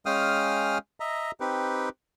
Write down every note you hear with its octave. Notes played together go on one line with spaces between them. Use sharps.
G#3 C#4 F5 G5 D#6 F6
D#5 E5 A#5
C4 D#4 G4 B4